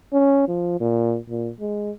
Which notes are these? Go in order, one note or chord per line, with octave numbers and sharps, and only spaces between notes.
C#4
F3
A#2
A#2
G#3